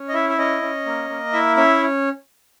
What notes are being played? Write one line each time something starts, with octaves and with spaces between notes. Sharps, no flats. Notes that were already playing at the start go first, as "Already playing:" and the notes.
Already playing: C#4
D#5
E4 E5
E5
C#4 D#5
C#4
A#3
A#3
E4 E5
C#4 E5